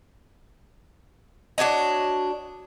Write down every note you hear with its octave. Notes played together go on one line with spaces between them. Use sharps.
D4 F#4 C#5 D#5